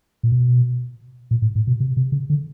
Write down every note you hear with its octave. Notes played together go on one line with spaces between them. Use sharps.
A#2
B2
A#2
A2
A2
B2
C3
C3
C#3
D3